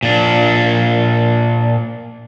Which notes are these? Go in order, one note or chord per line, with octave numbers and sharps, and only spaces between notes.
A#2 D4